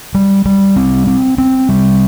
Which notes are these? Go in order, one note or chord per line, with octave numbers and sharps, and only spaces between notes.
G3
G3
C4
C4
C4
G3